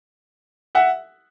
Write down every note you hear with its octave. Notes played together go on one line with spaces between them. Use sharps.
E5 F#5